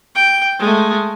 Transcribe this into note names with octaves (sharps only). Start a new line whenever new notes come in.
G5
G#3 A3